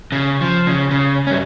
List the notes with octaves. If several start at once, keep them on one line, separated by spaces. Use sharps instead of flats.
C#3
F3
C#3
C#3
G2 C#4